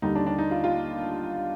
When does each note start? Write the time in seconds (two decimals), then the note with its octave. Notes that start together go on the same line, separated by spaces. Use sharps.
0.02 D#2 D3 G3 D#4
0.15 D4
0.26 D4
0.39 D#4
0.51 F4
0.64 F4